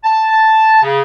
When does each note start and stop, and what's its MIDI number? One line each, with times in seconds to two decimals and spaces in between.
0.04 0.83 81
0.83 1.02 49